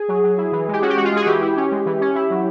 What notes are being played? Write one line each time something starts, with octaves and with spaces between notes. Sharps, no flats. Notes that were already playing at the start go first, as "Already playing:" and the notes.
Already playing: G#4
F#3
F#3
E4
E3
G#3 G4
C#4 F#4
G4
G#3 F#4
F4
G#3 G#4
F#4
E3 G4
E4
C#4
G#3
E3
C#4
E4
F#3